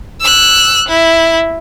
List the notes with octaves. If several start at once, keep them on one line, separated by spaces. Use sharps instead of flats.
E6 F#6
E4